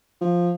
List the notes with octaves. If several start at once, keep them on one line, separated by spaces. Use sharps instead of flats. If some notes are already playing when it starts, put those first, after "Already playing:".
F3